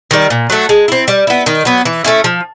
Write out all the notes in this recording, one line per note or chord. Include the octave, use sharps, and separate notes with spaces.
D#3 G3
A#2
F#3 A3
G#3
C4 E4
G3
B3 E4
D#3
F#3 B3
E3
A3 C#4 E4
F3